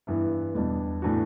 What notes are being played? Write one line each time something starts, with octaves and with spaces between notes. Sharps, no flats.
G2 E3 B3 E4
E2 B2 G3 D4
A2 E3 A3 D4 F#4